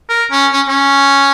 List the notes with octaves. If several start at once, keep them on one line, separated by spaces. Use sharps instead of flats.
A#4
C#4
C#4
C#4